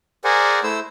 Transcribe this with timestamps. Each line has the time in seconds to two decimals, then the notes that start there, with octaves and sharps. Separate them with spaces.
0.24 G#4 A#4 C5 D5 F#5 G#5
0.64 A3 E4 C5 E6